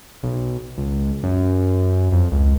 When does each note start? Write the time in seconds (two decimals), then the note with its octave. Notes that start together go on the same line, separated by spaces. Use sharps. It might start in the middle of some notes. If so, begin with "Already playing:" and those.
0.23 B1
0.78 C#2
1.23 F#2
2.12 F2
2.32 C#2